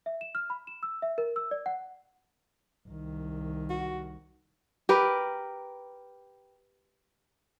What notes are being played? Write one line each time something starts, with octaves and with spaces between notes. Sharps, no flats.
E5
E7
F6
B5
E7
E6
E5
A#4
E6
D5
F#5
C2 D#3
F#4
G4 A#4 B4